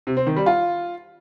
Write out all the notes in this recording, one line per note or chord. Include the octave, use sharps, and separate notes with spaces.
C3
C4
D#3
G3
F4